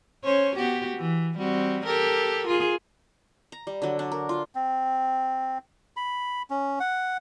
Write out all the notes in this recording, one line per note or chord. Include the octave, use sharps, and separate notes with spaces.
C#4 C5 C#5
B3 F#4 G4
E3
G3 C4 F#4
G4 A4 A#4
F4 G#4
A#5
G3
D3 F#3
D4
A#4
F4
C4
B5
C#4
F#5